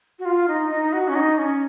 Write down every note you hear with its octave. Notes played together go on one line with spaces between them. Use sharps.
F#4
F4
D#4
D#4
F#4
C#4
D#4
C#4